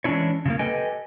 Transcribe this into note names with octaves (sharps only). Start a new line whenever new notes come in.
E3 G#3 C#4 D4 E4 C#5
C#3 F3 A#3
G4 A4 B4 D#5 G5 G#5